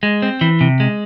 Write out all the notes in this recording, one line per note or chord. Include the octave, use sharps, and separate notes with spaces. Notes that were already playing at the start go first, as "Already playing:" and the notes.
G#3
C4
E3
C3
G#3